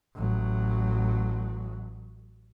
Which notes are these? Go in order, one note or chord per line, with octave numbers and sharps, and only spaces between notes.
A1 F#3